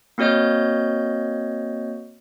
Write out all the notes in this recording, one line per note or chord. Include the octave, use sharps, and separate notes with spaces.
A#3 C4 F#4 C#5 D#5 G6